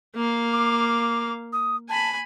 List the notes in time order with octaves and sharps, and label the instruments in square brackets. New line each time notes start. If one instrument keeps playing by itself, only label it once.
[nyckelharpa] A#3 F5
[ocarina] D6
D#6
[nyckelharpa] G#5 B5 [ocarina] A5